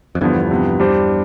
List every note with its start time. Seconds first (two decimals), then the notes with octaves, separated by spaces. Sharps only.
0.15 F2
0.21 E2 G2 D3 F3 B3
0.51 C3 F3 B3
0.80 G3 D4 G4 C5